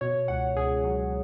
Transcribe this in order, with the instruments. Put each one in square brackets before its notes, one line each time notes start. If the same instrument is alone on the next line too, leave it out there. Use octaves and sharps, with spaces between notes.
[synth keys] B2 C#5
C#2 F#5
C#2 G#4
F#3